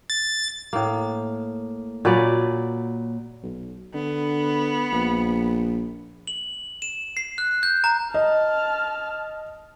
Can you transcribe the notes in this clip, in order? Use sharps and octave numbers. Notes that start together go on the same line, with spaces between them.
A6
A2 A#3
A#2 F#3 B4 D5
B1
D3 B3
A#1
F#7
E7
C7
F#6
G6
A#5
D#5 A5 F6